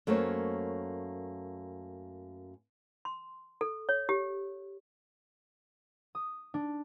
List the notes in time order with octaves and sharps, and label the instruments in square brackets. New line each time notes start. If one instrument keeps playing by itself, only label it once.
[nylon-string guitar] F#2 A3 A#3 C5 C#5
[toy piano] C6
A4
C#5
G4
[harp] D#6
D4